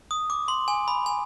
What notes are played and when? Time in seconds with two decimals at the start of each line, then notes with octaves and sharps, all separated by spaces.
0.11 D#6
0.30 D6
0.48 C6
0.68 G#5
0.88 B5
1.06 G#5